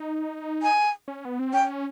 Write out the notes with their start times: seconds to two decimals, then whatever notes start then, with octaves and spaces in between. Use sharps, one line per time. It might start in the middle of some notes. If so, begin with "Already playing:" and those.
Already playing: D#4
0.63 G#5
1.08 C#4
1.25 B3
1.39 C4
1.53 C#4 G5